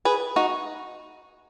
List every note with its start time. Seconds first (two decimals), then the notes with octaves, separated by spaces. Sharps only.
0.05 G#4 B4
0.36 D#4 F#4